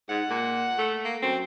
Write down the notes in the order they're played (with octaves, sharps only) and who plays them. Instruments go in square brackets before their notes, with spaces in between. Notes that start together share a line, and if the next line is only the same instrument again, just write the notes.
[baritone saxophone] G#2 [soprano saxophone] F#5
[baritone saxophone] A#2
A3
[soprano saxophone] A#3
[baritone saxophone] F#2 [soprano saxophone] C4